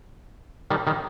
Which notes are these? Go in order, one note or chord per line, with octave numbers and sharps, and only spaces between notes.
D#3 G3
D#3 G3